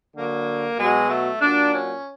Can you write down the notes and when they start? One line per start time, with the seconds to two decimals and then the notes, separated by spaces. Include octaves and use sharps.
0.15 D3 F#3 A#3
0.77 B2 F#3 G#3
1.09 A3
1.41 A#2 F#3 D4
1.72 C#4